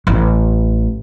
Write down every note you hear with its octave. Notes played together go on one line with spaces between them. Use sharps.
A1